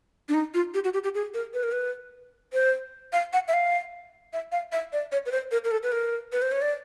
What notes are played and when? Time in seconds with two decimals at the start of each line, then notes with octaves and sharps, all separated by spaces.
0.29 D4
0.34 D#4
0.54 F4
0.74 G4
0.84 F#4
0.94 G4
1.04 G4
1.15 G#4
1.34 A#4
1.54 B4
1.63 A#4
1.72 B4
2.53 C5
3.13 F5
3.33 F#5
3.48 E5
3.53 F5
4.33 E5
4.52 F5
4.72 E5
4.93 D5
5.12 C#5
5.26 B4
5.32 C5
5.52 A#4
5.65 A#4
5.71 A4
5.83 B4
5.92 A#4
6.32 B4
6.42 C5
6.52 C#5
6.62 D5